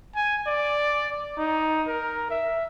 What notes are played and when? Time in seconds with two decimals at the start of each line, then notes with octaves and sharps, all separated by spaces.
0.16 G#5
0.47 D5
1.38 D#4
1.87 A#4
2.31 E5